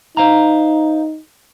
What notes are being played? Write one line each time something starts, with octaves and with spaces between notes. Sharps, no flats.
D#4 C5 F5 A#5